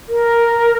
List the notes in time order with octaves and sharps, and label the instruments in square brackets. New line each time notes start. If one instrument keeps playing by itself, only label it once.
[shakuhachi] A#4